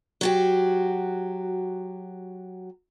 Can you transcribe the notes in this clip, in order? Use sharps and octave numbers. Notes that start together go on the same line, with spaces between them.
F#3 F#4 G4